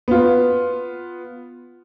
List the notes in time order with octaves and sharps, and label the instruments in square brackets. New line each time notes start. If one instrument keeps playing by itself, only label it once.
[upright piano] B3 F4